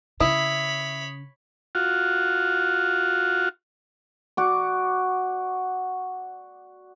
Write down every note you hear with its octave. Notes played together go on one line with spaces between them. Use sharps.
C#3 E4 C#5 B5 D#6
F4 F#4
F#4 D5